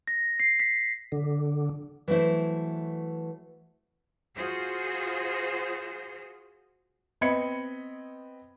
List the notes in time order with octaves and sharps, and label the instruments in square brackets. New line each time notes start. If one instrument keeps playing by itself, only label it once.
[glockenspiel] A#6
C7
B6
[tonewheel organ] D3
[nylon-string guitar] E3 F#3 A3 E4 C5
[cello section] F4 F#4 G#4 C5
[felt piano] B3 C4 D#5 B5 G#6 C#7